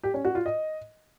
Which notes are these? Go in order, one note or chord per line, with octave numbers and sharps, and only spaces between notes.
G4
C#4
F#4
F4
D#5